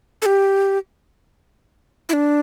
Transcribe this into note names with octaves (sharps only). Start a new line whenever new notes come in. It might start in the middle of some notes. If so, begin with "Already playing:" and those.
A4
G4
E4
D4